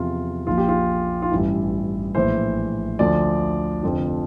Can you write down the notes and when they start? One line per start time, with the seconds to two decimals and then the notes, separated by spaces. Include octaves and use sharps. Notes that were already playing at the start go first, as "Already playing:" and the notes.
Already playing: E2 C3 F3 F4
0.47 A#1 A#2 F3 F4
0.57 G4
0.69 F4
1.22 F4
1.32 A1 G2 E3 E4
2.15 A#1 A2 E3 C5
2.99 D2 D3 F3 D5
3.83 F1 F2 D3 F3